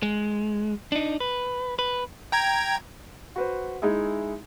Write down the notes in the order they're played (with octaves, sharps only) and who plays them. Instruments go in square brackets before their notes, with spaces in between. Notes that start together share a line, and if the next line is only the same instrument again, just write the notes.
[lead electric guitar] G#3
D4 D#4
B4
B4
[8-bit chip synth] G5 A#5 G#6
[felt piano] F#4 B4 C5
G#3 D#4 E4 G#4 E5